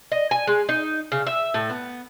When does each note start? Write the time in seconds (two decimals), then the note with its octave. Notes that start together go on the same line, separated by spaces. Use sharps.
0.12 D#5
0.31 G#5
0.47 G#3
0.69 D#4
1.12 C#3
1.27 E5
1.54 A2
1.70 B3